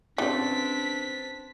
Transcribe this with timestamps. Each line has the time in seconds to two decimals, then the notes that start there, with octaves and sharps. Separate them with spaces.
0.18 C#3 E3 C4 D4 B4 E5 B6